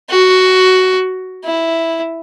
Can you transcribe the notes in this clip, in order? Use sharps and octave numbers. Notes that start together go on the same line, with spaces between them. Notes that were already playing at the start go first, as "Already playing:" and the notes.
F#4
E4